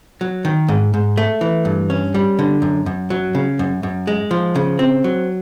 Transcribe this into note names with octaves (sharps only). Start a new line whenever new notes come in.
F#3
D#3
G#2
G#2
A3
E3
G2
C#4
G3
D3
F#2
F#2
F#3
C#3
F#2
F#2
G#3
F3
C#3
C4
F#3